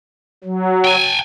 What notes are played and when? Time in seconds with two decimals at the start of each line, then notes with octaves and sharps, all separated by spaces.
0.44 F#3
0.85 G5 G#5